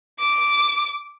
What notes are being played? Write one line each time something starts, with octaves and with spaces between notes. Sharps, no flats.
D6